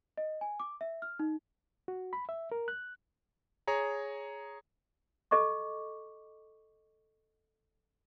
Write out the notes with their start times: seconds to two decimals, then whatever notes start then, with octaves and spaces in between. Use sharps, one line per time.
0.18 D#5
0.41 G#5
0.60 D6
0.81 E5
1.02 F6
1.19 D#4
1.88 F#4
2.13 B5
2.29 E5
2.52 A#4
2.68 F#6
3.67 G#4 C#5 A#5
5.31 A4 D#5 C#6 D6